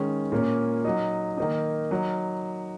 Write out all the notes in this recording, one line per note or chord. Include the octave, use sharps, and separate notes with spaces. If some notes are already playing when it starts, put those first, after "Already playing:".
Already playing: D#3 G#3 C#4
A#2 A#3 C#4
F#3 D#4
D#3 A#3 D#4
F#3 D#4